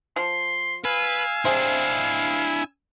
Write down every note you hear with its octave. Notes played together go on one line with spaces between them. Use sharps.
F3 C6
B4 F5 G#5 E6
C3 D4 E4 G#4 C5